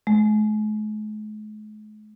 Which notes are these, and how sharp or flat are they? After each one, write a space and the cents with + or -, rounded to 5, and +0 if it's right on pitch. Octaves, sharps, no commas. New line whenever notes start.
G#3 +45